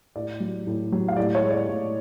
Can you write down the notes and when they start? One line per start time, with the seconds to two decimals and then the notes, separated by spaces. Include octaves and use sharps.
0.16 A2 D5
0.40 F#3
0.67 A2
0.92 F#3
1.08 F5
1.17 A2 D5
1.35 C#5
1.43 G#3
1.51 D5
1.68 A2